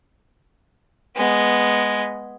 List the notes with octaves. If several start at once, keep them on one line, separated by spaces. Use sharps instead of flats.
G#3 B3